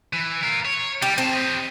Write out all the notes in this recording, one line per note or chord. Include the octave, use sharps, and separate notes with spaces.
E3
F4 A#4
C#5
G3 G4
D#3 C4 A5
G4 D#5